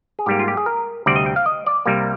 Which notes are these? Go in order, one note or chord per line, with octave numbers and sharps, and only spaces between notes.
G#4
G#2 G3 A#3 G4
F4
G4
G#4
A#4
D2 C3 G3 C4 D5
D#5
G5
F5
D#5
D5
C2 C3 G3 A#3